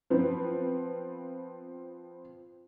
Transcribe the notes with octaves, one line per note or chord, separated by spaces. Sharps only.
F3 B3 C4 B4